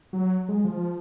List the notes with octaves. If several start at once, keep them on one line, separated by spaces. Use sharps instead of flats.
F#3
G#3
F3